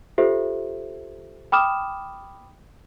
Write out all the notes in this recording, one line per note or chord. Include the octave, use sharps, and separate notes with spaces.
F4 G4 A4 C5 E5
G5 B5 D6 D#6 F6 E7